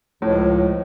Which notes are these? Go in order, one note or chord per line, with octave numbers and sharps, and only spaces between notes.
C#2 A2 F3 C#5